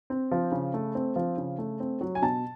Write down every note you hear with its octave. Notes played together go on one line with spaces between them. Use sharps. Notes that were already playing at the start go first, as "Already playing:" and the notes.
C4
F3
C#3
A3
C4
F3
C#3
A3
C4
F#3
G#5
B2 A5